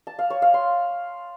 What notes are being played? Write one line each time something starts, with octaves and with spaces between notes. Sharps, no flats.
A5
F5
C#5
F5
C6